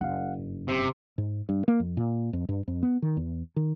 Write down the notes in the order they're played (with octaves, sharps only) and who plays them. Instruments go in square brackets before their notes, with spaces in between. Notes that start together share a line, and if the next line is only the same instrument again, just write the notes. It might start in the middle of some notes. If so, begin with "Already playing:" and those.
[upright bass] F#1 [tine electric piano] F5 F#5
[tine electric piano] G2
[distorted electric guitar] C3
[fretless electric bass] G#2
G2
A#3
F2
A#2
F2
G2
F2
B3
D#3
E2
D#3